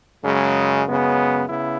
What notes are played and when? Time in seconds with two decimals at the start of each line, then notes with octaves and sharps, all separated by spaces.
0.24 F#2 C#3 G#3
0.86 F#2 C#3 G#3 B3
1.49 C#3 B3 E4